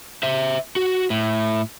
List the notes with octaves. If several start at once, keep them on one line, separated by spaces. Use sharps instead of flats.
C5 E5
F#4
A2